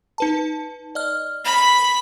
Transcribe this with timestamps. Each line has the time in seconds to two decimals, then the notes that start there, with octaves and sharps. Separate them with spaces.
0.18 D#4 B4 A5
0.95 D5 D#5 F6
1.45 B5